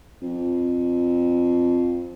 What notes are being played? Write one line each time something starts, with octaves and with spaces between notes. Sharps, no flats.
F2